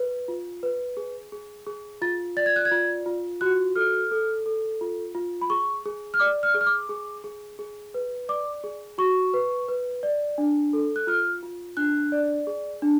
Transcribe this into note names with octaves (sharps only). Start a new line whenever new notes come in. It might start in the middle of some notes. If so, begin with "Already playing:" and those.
Already playing: B4
F4
B4
G#4
G#4
G#4
F4 A6
D5 A6
G#6
F#6
G#6
F4
F4
F#4 F#6
A4 F6
A4
A4
F4
F4
B5
G#4 C#6
G#4
F6
D5 D6
F6
G#4
F6
D6
G#4
G#4
G#4
B4
D5 D6
G#4
F#4 C#6
B4
B4
D5
D4
A4
F#6
F4 F6
F4
D4 F#6
D5
G#4
D4